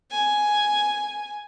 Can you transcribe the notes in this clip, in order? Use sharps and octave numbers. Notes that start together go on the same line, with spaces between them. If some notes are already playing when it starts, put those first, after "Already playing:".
G#5